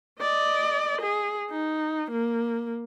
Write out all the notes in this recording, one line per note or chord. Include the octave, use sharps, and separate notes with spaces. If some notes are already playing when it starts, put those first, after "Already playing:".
D5 D#5
G#4
D#4
A#3